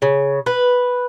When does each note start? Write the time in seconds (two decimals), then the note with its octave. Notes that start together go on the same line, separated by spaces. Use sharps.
0.02 C#3
0.46 B4